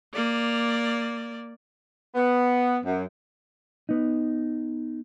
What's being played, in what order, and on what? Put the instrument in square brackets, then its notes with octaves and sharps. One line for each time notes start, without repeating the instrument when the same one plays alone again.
[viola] A#3 D5
[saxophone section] B3
F#2
[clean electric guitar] B3 D#4